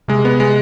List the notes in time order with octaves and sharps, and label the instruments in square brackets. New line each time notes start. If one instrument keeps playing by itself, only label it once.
[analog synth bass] C3 [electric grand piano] G#3
[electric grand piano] B3
G#3